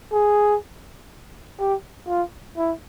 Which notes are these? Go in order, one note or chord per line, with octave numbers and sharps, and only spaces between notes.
G#4
G4
F4
E4